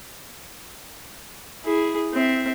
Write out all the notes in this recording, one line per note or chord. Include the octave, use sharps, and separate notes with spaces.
E4 G#4
C4 E5